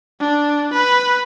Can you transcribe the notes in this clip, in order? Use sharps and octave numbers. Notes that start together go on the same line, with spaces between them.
D4
B4